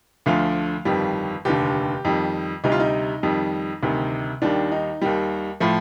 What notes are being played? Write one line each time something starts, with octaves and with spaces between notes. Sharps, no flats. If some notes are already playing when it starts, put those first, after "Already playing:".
D2 D3 F3 A3 F5
G1 F2 D#3 G3
F1 D#2 D3 G4
F2 D#3 G3
D2 C3 G3 D#4
F4
D#4
F2 D#3 G3
D2 C3 D#3 G3
D#2 D#3 G3 D4
D#4
D#2 D#3 G3
A2 F3 A3